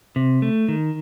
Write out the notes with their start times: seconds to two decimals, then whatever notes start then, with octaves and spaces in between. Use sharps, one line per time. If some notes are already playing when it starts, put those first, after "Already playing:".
0.16 C3
0.42 A3
0.68 D#3